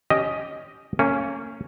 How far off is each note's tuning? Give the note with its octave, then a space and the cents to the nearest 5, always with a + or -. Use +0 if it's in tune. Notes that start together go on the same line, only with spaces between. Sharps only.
C#4 +15 G4 +0 D#5 +0
A#3 -35 C#4 +0